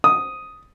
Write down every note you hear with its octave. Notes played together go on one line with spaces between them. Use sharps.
D#6